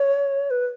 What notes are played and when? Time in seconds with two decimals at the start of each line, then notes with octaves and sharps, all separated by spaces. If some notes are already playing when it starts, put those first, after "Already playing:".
Already playing: C#5
0.51 B4